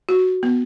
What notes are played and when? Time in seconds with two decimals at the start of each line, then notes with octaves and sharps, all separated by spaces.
0.09 F#4
0.43 B3